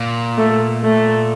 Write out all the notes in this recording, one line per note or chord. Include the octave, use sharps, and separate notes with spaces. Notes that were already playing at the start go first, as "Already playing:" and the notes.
Already playing: A#2
A3
A3